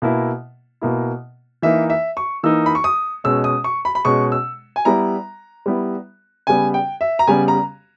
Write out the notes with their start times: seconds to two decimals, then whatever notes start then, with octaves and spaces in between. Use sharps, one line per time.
0.02 B2 A#3 E4
0.81 B2 A#3 E4
1.62 E3 A#3 D#4 E5
1.90 E5
2.17 C#6
2.43 E3 A#3 D#4 E6
2.66 B5
2.75 C#6
2.84 D#6
3.24 B2 G#3 C#4 E6
3.44 D#6
3.64 C#6
3.85 B5
3.95 B5
4.05 B2 G#3 C#4 C#6
4.32 E6
4.76 G#5
4.85 G3 B3 E4 A#5
5.66 G3 B3 E4
6.47 C#3 G3 B3 G#5
6.74 G5
7.01 E5
7.19 A#5
7.27 C#3 G3 B3 G#5
7.48 A#5